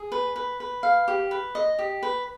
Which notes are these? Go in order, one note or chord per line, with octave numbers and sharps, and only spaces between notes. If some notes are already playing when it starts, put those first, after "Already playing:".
Already playing: G#4
B4
B4
B4
F5
G4
B4
D#5
G4
B4